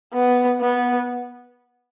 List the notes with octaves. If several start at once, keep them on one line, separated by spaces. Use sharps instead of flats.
B3
B3